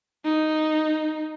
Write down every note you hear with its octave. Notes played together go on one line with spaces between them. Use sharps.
D#4